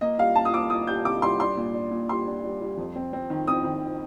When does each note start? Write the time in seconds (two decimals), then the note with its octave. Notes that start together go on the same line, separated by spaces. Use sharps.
0.01 A#3 D#5
0.18 G3 F5
0.35 A#3 A5
0.45 D#6
0.54 A#3 D6
0.70 A#3 D#6
0.87 G3 G6
1.05 C3 D6
1.22 G3 C6
1.40 D4 C6
1.57 A#2
1.74 D4
1.91 A#2
2.09 G3 C6
2.27 D4
2.44 G3
2.61 G3
2.78 F2
2.96 C4
3.13 C4
3.30 D#3
3.47 C4 D#6
3.64 D#3